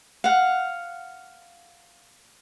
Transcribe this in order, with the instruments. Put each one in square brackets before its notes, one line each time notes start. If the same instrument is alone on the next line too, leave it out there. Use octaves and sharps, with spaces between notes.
[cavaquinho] F5 F#5